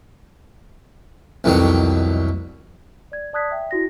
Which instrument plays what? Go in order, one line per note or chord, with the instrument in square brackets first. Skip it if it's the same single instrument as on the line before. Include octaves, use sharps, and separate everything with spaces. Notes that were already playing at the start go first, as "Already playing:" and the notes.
[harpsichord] C2 F2 B2 D#3 F#3
[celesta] D5 G#6
D5 A5 D#6 F#6 G#6 B6
E5 G5
E4 F#4 A#6